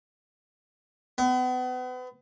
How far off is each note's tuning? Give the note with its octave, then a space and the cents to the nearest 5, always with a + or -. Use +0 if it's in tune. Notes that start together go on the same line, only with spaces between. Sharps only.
B3 +35